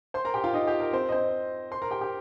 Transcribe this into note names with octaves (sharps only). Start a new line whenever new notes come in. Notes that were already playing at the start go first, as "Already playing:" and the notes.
C5 C6
A#4 A#5
G4 G5
F4 F5
D#4 D#5
G4
A#4
C4 C5
D#5
C4 C5
C5 C6
A#4 A#5
G4 G5
G4